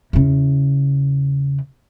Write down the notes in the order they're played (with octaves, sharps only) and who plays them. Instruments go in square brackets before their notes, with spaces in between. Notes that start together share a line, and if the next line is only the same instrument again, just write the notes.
[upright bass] E2 C#3